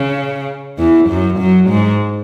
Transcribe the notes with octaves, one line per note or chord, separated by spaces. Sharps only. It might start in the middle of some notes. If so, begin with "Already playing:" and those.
Already playing: C#3
E2 E3
F#2 F#3
F#2 F#3
G#2 G#3